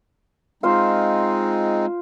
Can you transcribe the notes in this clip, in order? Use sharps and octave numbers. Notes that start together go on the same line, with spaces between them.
G#3 C4 D#4 F4 C5 F5